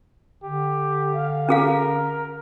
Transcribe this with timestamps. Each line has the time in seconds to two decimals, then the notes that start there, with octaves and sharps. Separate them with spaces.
0.43 D3 G4
1.14 F5
1.49 C#4 G#4 A#4 F5